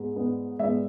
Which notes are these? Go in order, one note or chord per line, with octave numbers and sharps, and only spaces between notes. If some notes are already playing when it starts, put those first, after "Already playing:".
Already playing: G#2 G#3 B3
G#2 G#3 B3
G#2 G#3 B3 E5